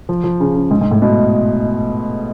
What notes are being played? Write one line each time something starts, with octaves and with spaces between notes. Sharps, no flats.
F3
F3
C#3
C#3
G#2
G#2
A2
B2